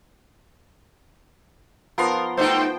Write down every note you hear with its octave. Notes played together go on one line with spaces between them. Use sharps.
F3 B3 A#4 C6
A3 D#4 F#4 C5 G5